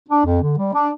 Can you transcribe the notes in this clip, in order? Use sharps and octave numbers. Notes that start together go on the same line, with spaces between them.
D4
F2
D3
G3
D4